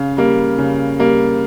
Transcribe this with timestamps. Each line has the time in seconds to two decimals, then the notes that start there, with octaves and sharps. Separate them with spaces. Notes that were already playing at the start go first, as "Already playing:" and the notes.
Already playing: C#3 F5
0.17 G3 A#3
0.58 C#3
0.99 G3 A#3